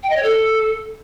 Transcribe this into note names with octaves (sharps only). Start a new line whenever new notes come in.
G5
D#5
C#5
A4